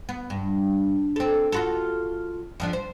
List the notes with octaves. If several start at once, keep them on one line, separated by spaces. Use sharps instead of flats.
B3
G2
C4 A4
F4 F#4 A4
F2 F3 D4
C5